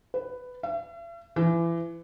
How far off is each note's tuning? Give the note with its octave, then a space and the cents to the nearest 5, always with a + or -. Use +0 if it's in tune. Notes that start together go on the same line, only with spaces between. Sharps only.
B4 +10
E5 +45
E3 +30